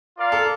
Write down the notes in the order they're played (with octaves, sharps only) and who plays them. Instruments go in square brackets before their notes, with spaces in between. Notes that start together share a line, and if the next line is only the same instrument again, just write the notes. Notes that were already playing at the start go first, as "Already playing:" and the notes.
[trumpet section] F4 A#4 D5 F5
[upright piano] A4